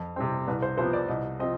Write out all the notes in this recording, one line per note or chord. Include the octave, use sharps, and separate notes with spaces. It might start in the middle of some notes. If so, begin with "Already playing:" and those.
Already playing: F2
C3 G3 C4
C2 B4
C5
C3 F3 B3 C5
D5
C2 D#5
F3 C4 D#5